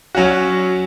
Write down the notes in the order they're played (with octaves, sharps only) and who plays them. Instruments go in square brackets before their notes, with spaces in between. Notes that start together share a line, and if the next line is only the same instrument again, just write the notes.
[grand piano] F#3 C#4 F#4